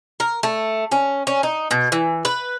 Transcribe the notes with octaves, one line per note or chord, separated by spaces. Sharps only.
A#4
A3
C#4
C#4
D#4
B2
E3
B4